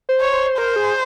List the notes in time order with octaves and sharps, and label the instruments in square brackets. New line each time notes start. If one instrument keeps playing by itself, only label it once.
[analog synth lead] C5
[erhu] C#5
[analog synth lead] C5
[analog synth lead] A#4 [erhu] C5
[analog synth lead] G#4